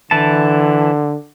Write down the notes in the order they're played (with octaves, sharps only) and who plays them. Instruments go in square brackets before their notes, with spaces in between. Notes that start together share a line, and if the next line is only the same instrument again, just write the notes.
[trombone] D3 [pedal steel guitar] E3 E4 A5